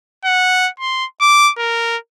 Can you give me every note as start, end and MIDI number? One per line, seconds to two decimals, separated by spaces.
0.25 0.69 78
0.80 1.05 84
1.21 1.51 86
1.58 1.97 70